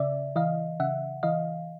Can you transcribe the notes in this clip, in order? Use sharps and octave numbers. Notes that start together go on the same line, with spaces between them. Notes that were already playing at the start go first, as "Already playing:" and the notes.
Already playing: C#3 D5 E5
E3 D#5 F5
C#3 E5 F#5
E3 D#5 F5